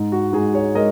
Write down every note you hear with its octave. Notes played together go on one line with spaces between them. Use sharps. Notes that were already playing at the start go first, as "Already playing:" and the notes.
Already playing: G#2 D#4
F#4
G#2 D#4 G#4
G#4 C#5
G#3 A#4 D#5